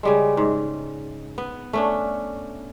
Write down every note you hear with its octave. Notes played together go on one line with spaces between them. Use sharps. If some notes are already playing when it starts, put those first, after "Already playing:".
C#3 G3 G#3
G#2
B3
A3 C#4 D4